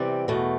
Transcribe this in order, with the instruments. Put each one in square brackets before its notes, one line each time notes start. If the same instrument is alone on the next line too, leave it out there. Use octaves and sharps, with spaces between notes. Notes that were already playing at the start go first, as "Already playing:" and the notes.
Already playing: [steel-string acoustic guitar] C3 E3 G3 D5
E2 B2 A3